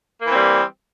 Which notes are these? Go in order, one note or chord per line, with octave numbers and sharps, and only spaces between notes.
E3 G3 A#3 C4